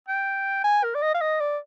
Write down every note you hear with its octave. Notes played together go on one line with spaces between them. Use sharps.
G5
G#5
A#4
D5
D#5
F5
D#5
D5